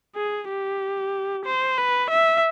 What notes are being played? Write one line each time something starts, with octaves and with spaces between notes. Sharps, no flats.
G#4
G4
C5
B4
E5